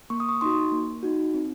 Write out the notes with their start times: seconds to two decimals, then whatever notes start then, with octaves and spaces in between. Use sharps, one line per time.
0.10 A#3 C#6
0.20 D#6
0.29 C#6
0.41 D#4 F#4 C6
0.72 A#3
1.03 D#4 F#4
1.34 C4